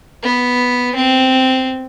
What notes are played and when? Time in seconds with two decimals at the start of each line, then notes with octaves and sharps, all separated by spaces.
0.23 B3
0.95 C4